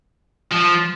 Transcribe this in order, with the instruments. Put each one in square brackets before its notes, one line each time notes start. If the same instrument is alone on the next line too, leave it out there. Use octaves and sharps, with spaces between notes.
[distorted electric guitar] F3